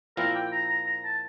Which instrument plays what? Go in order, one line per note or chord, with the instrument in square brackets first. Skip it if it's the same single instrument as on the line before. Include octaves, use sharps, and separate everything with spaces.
[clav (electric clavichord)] A#2 F3 C4 E4 [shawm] A#4
[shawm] G5
A#5
A#5
A#5
A5